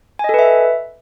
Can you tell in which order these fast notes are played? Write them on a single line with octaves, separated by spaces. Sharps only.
G#5 D#5 A4 B4 E5